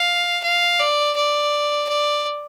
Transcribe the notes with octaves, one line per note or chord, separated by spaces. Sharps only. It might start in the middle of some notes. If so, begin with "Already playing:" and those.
Already playing: F5
F5
D5
D5
D5